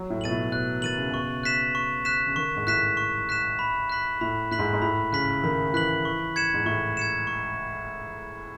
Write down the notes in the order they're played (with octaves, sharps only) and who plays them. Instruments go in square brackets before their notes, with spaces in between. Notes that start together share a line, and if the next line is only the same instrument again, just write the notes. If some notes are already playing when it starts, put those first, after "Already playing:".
Already playing: [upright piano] F#3
A2
[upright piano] B2 [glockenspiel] A6 D#7 F#7
[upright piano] A2
[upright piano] B2 [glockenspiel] F#6
[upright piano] D#3 [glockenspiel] A6 D#7 F#7
[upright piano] C#3
[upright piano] B2 [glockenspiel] C#6
[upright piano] C#3
[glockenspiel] F#6 B6 E7
C#6
F#6 B6 E7
[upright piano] C#3
[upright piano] D#3 [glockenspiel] C#6
[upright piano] G#2
[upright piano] A2 [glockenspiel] F#6 B6 E7
[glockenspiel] C#6
F#6 B6 E7
B5
F#6 B6 F#7
[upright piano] A2 [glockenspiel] B5
[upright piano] A2 [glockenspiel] F#6 B6 F#7
[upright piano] G#2
G#2
[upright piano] A2 [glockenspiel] B5
[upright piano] C#3 [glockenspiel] F#6 B6 F#7
[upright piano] D#3 [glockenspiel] B5
[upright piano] E3 [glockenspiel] F#6 B6 F#7
[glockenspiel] C#6
G#6 C#7 E7
[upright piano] G#2
[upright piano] A2 [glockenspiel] C#6
[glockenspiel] G#6 C#7 E7
C#6